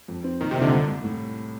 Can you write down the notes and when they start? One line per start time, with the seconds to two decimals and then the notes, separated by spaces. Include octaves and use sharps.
0.08 F2
0.24 C4
0.40 A#2 D#3
0.51 C3
0.57 A#2 D3
0.72 C2
0.88 C2
1.04 A2